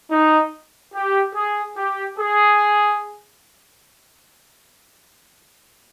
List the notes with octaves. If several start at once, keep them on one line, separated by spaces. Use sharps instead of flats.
D#4
G4
G#4
G4
G#4